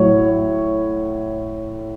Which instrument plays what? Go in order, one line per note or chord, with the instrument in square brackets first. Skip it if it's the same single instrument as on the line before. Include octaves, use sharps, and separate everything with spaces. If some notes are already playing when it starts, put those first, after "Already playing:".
Already playing: [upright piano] A2 F#3 C#5